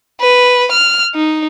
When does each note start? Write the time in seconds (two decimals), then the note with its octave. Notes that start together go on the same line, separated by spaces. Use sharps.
0.21 B4
0.72 F6
1.15 D#4